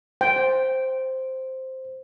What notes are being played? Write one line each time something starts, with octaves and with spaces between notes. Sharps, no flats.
C5 G5